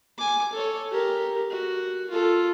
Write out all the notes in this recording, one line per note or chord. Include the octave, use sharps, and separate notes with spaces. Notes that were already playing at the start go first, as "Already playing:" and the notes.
G#5 D6
A4 C#5
G4 A#4
F#4
F4 A4